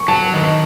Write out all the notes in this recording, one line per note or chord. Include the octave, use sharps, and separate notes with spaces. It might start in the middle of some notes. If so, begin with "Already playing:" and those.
Already playing: C#6
F#3 A5
D#3